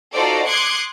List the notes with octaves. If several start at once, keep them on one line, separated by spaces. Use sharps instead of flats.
D#4 F4 F#4 A4 C5 D5
C6 D6 D#6 F#6 G#6 C#7